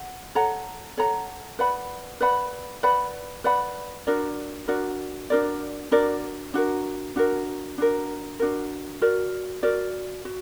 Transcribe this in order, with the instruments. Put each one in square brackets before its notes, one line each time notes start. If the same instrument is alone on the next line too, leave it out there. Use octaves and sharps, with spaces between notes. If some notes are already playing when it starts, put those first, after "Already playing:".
Already playing: [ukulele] F#5
A4 C#5 F#5 A#5
A4 C#5 F#5 A#5
B4 D5 F#5 B5
B4 D5 F#5 B5
B4 D5 F#5 B5
B4 D5 F#5 B5
D4 F#4 A#4 D5
D4 F#4 A#4 D5
D4 F#4 A#4 D5
D4 F#4 A#4 D5
D4 F#4 A#4
D4 F#4 A#4
D4 F#4 A#4
D4 F#4 A#4
F#4 A#4 D5
F#4 A#4 D5
F#4